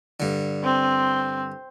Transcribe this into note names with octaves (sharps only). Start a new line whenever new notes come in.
G2 D3
C4